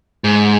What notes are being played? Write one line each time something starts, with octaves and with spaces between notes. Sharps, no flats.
G#2